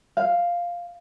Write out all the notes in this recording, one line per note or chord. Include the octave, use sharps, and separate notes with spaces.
F5